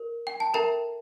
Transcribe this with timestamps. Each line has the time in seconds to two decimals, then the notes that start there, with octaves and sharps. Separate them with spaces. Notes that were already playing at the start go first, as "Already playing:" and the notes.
Already playing: A#4
0.27 G5
0.40 A5
0.54 A4 A#4 E5 G5 A#5